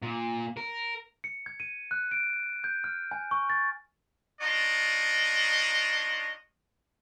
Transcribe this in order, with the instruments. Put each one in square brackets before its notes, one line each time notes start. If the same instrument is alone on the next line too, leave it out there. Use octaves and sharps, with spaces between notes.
[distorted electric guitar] A#2
A#4
[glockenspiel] C#7
G#6
D#7
F#6
D7
G6
F6
G#5
C#6
A6
[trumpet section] D4 D#4 F4 C#5 D#5